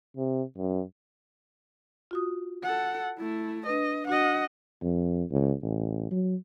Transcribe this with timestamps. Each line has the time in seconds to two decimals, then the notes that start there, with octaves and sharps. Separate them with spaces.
0.17 C3
0.58 F#2
2.11 F4 F#4 D#6
2.63 A4 F#5
3.18 A3 E4
3.66 D4 B4 D#5
4.07 D4 F#4 D#5 F#5
4.82 F2
5.31 C#2
5.62 A1
6.11 F#3